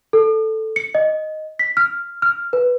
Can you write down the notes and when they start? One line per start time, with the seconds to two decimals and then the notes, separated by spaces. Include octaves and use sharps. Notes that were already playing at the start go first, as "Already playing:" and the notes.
0.13 A4
0.76 C#7
0.95 D#5
1.59 B6
1.77 F6
2.22 F6
2.53 B4